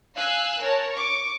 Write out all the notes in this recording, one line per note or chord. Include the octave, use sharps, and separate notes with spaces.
F5 G#5 E6 F#6
A#4 C#5 A5
C#6 D6